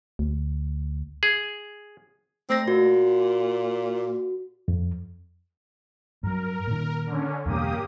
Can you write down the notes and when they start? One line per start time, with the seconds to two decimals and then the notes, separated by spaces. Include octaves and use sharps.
0.19 D2
1.23 G#4
2.50 A3 C4 A#6
2.68 A#2 F#4
4.68 F2
6.23 G2 F#3 A#4
6.67 A#2 D#3
7.07 D3 C#4
7.46 E2 G2 B2 A#3 G4 D#6